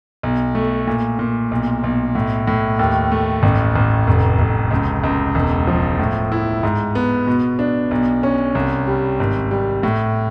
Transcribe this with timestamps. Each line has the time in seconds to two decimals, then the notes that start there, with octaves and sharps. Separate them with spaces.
0.23 B1
0.55 A3
0.87 A#2
1.19 A#2
1.51 B1
1.84 B1
2.15 A2
2.48 A2
2.79 D#2
3.12 A3
3.43 A1
3.76 A1
4.07 F1
4.39 F1
4.71 C#2
5.04 C#2
5.35 E1
5.67 F3
5.99 A2
6.32 E4
6.63 G#2
6.95 B3
7.27 B2
7.59 D4
7.91 B1
8.23 C#4
8.55 C2
8.88 G3
9.20 G#1
9.51 G3
9.83 A2